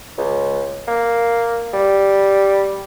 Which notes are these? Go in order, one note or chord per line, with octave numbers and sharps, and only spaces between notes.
C#2
A#3
G3